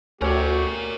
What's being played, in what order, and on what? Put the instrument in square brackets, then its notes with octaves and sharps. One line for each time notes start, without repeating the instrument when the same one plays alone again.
[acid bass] D2 [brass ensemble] A3 F#4 G4 [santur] C#4 C#5 [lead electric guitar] A#4 D5